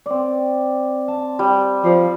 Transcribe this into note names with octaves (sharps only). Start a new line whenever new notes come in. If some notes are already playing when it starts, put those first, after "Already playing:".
C4 D5
A5
G3 G5
F3 D5